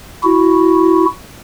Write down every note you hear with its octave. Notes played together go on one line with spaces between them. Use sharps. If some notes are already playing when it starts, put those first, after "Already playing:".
E4 F#4